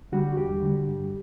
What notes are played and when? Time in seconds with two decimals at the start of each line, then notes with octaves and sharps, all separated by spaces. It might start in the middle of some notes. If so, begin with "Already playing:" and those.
0.12 D3 G3 F#4
0.37 E2 G4
0.63 D3 G3
0.87 G2